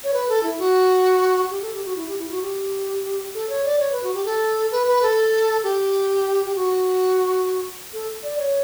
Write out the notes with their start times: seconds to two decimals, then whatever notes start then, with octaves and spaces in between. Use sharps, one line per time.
0.04 C#5
0.13 B4
0.29 A4
0.43 E4
0.59 F#4
1.50 G4
1.62 A4
1.74 G4
1.85 F#4
1.96 E4
2.08 G4
2.19 E4
2.31 F#4
2.42 G4
3.34 A4
3.49 C#5
3.65 D5
3.79 C#5
3.92 B4
4.03 F#4
4.14 G4
4.25 A4
4.72 B4
4.87 B4
5.02 A4
5.63 G4
6.46 G4
6.55 F#4
7.93 A4
8.23 D5
8.39 C#5